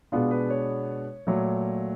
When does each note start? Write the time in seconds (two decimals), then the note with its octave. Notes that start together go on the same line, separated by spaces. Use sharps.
0.12 B2 G#3 B3 D4 F4
0.31 B4
0.50 C#5
1.27 A#2 F#3 A3